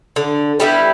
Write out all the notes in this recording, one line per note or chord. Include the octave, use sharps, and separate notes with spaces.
D3
G3 B3 E4